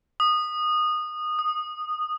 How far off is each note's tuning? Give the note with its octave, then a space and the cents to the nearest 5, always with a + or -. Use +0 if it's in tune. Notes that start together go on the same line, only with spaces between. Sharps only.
D#6 -20
D#6 -5